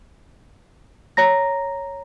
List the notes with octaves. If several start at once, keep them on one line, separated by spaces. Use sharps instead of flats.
C#5 A#5 A#6